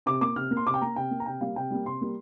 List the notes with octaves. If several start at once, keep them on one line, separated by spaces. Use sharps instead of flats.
C3 D6
A#3 D6
C3 F6
A#3
C6
C3 D6
G5
A#3 A#5
C3 G5
A#3
A#5
C3 G5
G3 A#3 F5
C3 G5
G3 A#3
C3 C6
G3 A#3